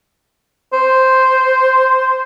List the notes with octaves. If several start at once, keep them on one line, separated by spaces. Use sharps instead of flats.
C5